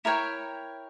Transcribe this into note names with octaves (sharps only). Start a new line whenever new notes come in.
E4 A#4 C#5 G5